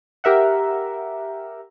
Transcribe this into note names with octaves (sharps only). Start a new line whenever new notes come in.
G4 A#4 E5 F#5